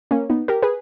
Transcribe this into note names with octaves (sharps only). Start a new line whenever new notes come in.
A#3 C#4
B3 D#4
G4 A#4
G#4 B4